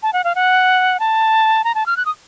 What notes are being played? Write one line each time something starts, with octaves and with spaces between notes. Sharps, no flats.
A5
F#5
F5
F#5
A5
A#5
A5
F6
F#6
D#6